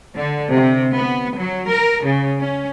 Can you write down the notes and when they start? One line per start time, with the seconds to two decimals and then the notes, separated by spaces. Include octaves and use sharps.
0.15 D3
0.53 C3
0.92 B3
1.34 F#3
1.70 A#4
2.05 C#3
2.41 C#4